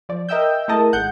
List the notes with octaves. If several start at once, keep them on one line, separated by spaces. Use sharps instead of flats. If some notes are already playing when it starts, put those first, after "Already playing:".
F3 D5
A#4 D#5 E5 G5 E6 G6
A3 E4 G#4 A#4 D#5 A5
G#1 F#5 G6